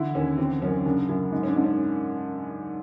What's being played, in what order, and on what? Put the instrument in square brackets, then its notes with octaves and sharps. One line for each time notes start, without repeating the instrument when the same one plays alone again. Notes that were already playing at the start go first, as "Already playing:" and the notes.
Already playing: [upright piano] D3 E3 E4
D#2 C#4
E3 C4
F#2 C#4
C#3 D4
F#2 E4
G#2
C#4
D4
G#2
C#4